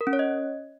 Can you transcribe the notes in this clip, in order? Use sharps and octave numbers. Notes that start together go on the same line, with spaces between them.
A#4
C#4
C#5
D#5